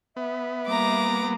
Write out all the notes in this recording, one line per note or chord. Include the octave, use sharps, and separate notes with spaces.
B3 E5
G3 A#3 A#5 D6